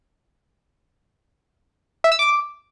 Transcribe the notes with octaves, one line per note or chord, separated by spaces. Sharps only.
E5
E6
D6